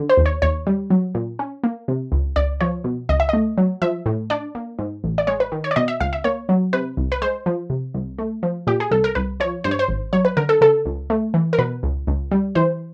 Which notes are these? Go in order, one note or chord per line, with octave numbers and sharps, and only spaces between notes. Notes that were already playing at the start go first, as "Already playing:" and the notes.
Already playing: D3
C5
D#2
C#5
D#2 C#5
G3
F#3
A#2
C#4
A#3
C3
C#2
C#2 D5
F3 C#5
B2
C#2 D#5
E5
A3 D#5
F#3
F3 E5
A2
D4 D5
A#3
G#2
A1
D5
G#3 C#5
B4
D#3
C#5
D5
B2 D#5
E5
C#2 F5
E5
A#3 C#5
F#3
C3 B4
C2
B4
G#3 C5
F3
C3
C2
A3
F3
A#2 G4
G#4
C2 A4
A#4
C2 B4
F3 C#5
G2 C5
C#5
C5
G#1
F#3 C#5
B4
D3 A#4
A4
C#3 A4
C#2
A3
E3
A#4
B2 B4
C#2
C#2
G3
E3 C5